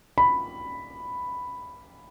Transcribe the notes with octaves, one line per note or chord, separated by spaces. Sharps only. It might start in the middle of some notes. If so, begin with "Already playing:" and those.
B5